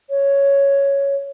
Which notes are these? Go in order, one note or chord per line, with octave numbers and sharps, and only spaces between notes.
C#5